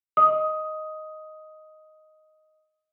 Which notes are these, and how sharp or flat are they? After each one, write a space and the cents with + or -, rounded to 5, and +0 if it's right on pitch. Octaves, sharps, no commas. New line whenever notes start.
D#5 +0 D#6 +10